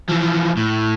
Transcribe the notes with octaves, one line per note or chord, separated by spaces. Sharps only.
E3 F3
A2